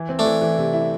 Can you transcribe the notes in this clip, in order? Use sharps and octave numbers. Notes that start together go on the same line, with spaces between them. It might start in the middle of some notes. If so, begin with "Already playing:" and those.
Already playing: E3
C4
A3 D4
E3
E3
C3
E4